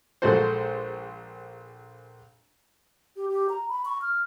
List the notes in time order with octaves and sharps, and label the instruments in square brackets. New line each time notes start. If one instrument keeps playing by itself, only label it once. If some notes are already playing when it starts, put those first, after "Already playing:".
[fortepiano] A#1 G#3 F#4 A4 C5
[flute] G4
G4
A#5
B5
C#6
F6